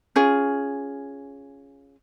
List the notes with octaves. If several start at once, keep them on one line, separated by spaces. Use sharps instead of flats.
C#4 F4 G#4